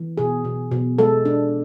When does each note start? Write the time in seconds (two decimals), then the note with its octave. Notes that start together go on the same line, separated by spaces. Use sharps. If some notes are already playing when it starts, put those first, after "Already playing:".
Already playing: E3
0.18 B2 G#4
0.44 B2
0.71 B2
0.99 G#3 A4
1.25 D4